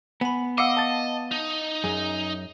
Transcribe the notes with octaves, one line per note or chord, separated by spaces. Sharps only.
B3 G#5 B5
D#5 F5 F#5 D6 E6
A5 A6
D#4
F#2 G#4